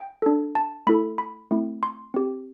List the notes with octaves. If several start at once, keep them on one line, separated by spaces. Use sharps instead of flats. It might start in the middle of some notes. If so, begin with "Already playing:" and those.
Already playing: G5
D4 A4
A5
A3 E4 A4 B5
B5
A3 C4 E4
C6
C4 G4